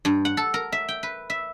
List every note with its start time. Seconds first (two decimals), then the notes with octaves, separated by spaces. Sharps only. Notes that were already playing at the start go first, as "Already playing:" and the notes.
0.05 G2
0.25 F#5
0.37 A4
0.54 A#4
0.72 E5
0.89 G5
1.03 B4
1.30 E5